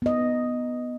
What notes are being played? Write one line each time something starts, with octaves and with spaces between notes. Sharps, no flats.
B3 D#5